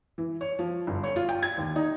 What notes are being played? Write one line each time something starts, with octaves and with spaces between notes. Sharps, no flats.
E3
C#5
F3
G1
C#5
F4
G5
G#6
D#2
D#4